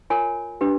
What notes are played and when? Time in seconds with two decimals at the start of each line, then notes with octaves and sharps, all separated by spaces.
0.10 F4 A#4 C#5 G#5
0.61 D4 G4 B4